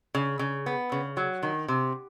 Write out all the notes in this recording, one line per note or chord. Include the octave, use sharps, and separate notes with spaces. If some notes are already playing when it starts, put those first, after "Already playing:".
C#3
C#3
B3
C#3
F#3
D#3
C3